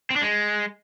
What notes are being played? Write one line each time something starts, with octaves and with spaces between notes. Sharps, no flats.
C4
D4
G#3